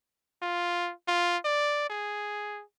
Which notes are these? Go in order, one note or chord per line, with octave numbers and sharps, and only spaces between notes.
F4
F4
D5
G#4